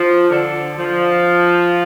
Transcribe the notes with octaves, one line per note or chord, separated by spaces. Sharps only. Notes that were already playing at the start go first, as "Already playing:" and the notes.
Already playing: F3
D3
F3